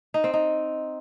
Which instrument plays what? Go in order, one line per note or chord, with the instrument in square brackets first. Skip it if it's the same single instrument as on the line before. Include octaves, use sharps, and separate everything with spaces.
[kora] D#4
C4
D#4